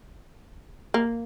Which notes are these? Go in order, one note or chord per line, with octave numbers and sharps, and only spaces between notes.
A#3